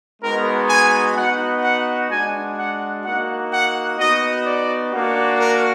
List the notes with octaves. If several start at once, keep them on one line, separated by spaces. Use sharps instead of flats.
G#3 B3 D#4 F#4 A#4
G#5
B3 D#4 F#4 F#5
F#5
G#3 D4 F#4 G#5
F#5
A#3 D#4 F#4 F#5
F#5
B3 D#4 F#4 D#5
D5
A#3 D4 F#4
A#4